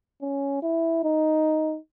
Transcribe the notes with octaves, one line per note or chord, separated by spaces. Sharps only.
C#4
E4
D#4